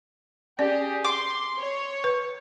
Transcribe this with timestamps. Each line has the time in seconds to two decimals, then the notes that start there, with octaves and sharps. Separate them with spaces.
0.59 C#4 G4 G#4 D5
1.04 C6 D6
1.59 C#5
2.04 B4